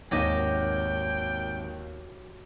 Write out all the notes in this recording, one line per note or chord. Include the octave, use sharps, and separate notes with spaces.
G#1 D#2 G#2 F#3 G4 D#5 G5